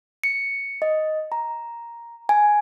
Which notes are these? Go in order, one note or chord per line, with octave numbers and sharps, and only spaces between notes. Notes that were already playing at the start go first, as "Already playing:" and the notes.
C#7
D#5
A#5
G#5